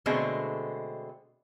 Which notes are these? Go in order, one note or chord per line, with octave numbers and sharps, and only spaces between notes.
B2 D3 G#3 A3 C4